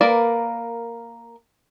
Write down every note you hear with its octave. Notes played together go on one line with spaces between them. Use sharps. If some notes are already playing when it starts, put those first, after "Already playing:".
A#3 A#4 B4 D5